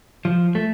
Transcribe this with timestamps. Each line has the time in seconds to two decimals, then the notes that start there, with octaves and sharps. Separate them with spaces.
0.25 F3
0.55 A3